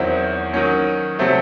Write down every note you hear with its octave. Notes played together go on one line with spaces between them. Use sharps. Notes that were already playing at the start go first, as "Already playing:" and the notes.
Already playing: E2 D#3 F#3 C4 E4
D#3 F#3 C#4
C3 F#3 A3 C4